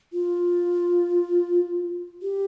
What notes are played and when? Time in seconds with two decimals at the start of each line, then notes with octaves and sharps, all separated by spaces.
0.13 F4
2.22 G4